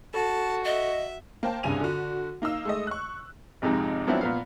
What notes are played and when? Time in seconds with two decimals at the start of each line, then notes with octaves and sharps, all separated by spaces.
0.14 F#4 A4 A5
0.65 D#5 E5
1.43 A#3 C5 G5 A5
1.63 C2 G2 C#3 G#5 D#7 F7
1.80 D3 F#4
2.42 A#3 D#4 F5 E6
2.65 G#3 A3 D#5
2.87 C#6 F#6
3.62 G#1 F2 C3 G#3 D#4
4.07 F3 F#3 B3 C4 D4 E4
4.21 A#2 B3 F5